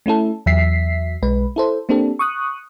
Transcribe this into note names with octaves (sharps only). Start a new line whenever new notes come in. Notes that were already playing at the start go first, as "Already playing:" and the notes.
A3 C#4 E4 A4
E2 F#3 E5 B6 C7
B1 G#3 B4
E4 A4 C5
A#3 C4 D4 G4 A4
C#6 D#6 F#6